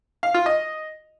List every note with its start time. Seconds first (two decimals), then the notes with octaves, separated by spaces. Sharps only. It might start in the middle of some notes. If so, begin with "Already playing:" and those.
0.23 F5
0.34 F4
0.46 D#5